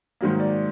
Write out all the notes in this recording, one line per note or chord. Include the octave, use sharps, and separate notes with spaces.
G#2 D#3 F#3 A#3
D5